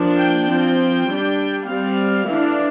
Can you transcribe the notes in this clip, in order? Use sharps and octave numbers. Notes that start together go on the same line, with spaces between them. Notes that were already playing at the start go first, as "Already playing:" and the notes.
Already playing: F3 A#3 D4
G5
F3 C4 G5
G3 D4
G3 C4 F5
E3 A3 D4